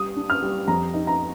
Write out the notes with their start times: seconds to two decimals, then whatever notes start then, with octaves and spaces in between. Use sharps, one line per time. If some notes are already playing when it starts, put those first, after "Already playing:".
Already playing: G3 D#6
0.16 D4
0.30 F6
0.42 G3
0.68 F2 A#5
0.94 D#4
1.07 A#5